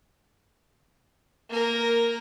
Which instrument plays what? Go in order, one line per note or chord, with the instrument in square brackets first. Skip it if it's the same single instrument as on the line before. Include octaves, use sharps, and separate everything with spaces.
[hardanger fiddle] A#3 A#4